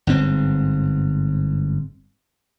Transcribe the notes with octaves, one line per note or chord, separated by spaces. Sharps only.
G1 G#2 C4